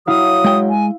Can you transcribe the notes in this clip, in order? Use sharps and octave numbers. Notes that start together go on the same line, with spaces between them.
F#3 E4 F5 D#6
G#3 G5
G#5